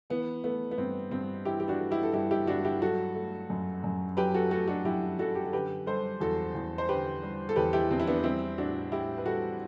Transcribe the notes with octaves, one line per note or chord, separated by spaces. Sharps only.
E3 B3
A3 B3
B3
G2 C4
G2 C4
E3 E4 G4
G4
D4 F#4
A3
E4 G4
A4
G2 E4 G4
E4 G4
G2 D4 F#4
E4 G4
F#3 F#4 A4
A3
F#2
F#2
F#3 G4 B4
F#4 A4
A3 F#4 A4
D4 F#4
F#2 E4 G4
F#2 F#4 A4
G4
A4
D3 G4 B4
G3 A4 C5
E2 F#4 A4
E2
C5
D3 G4 B4
G3
A4
E2 G4 B4
E4 G4
E2 C4
E4
B3 D4
G3 C4 E4
A2 D4 F#4
A2 E4 G4
B4
G3 F#4 A4